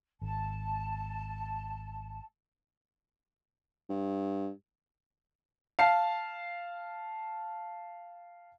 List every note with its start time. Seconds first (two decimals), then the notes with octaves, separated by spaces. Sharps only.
0.22 G#1 A5
3.89 G2
5.79 F5 A5 C7